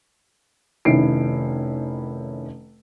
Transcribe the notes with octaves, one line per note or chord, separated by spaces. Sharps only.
F1 D#3 C#4 E4 C7 D7